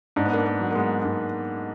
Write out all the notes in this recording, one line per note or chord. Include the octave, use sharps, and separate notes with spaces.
G#2 D4
B3
A#3 D4
A#3
F#3
A#3
G#3 B3
G#2 A#3